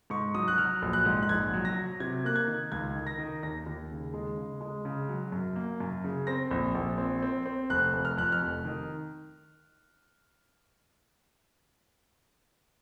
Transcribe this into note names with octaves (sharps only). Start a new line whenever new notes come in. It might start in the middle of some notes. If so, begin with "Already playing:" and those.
G#2 C#6
F#3 D#6
F#6
F#3 F6
A#1
F#6
G#2
F#6
A#1 G#6
F#3
A#6
F#3
C3 G#6
A#3 F#6
G#6
D#3
C#2 G#6
D#3
A#6
D#3
D#2 A#6
D#2
C#3
G#3
C#3
G#3
C#3
F#3
F#2
A#3
F#2
C#3
C4 A#6
A#1
A#1
C4
C4
C4
F1 F#6
F1
F6
F2 F#6
F6
F1
D#3